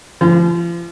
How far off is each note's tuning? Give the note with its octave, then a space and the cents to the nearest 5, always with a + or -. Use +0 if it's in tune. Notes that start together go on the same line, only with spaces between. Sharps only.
F3 -35 C6 -40